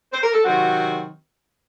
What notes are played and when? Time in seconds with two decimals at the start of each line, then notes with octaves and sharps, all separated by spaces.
0.13 C5
0.23 A#4
0.34 A4
0.44 C3 D#3 F#3 C4 F#4